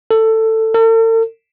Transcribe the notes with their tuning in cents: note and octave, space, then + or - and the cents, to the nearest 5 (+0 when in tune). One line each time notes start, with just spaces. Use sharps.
A4 +15
A4 +45